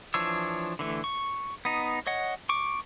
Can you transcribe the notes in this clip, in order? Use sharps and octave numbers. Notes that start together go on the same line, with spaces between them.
E3 F3 D4 C#5 E6
D3 E3 A3
C#6
B3 D#4
C#5 D#5 F#5
C#6 D6